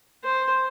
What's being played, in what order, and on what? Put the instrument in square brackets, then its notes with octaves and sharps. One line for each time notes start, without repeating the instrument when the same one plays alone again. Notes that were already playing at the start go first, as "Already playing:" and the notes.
[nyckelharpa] C5